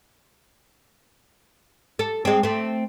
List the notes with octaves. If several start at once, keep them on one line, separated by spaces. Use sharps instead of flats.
A4
G#3 C4
A3 C4